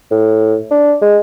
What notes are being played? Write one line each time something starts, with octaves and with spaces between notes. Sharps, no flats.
A2
D4
G#3